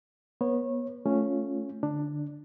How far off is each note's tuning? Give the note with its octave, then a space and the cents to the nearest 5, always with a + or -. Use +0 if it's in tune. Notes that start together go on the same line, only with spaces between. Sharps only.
B3 -30 C#5 -25
A3 -15 C#4 +0 F4 +0
D3 +0 D4 +10